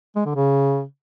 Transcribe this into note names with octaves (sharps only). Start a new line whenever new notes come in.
G#3
D3
C#3